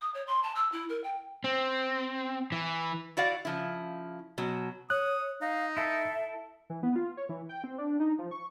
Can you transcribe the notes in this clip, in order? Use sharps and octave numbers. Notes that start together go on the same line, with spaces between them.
D#6
C#5
C6
A5
E6
E4
A#4
G5
C4
E3
E4 F#4 D5 F5
C#3 F3 E4
B2 F#3
C#5 D#6 F#6
D#4 F5
E4 A4 E5
E3
B3
F4
C#5
E3
G5
C4
D4
D#4
F3
C#6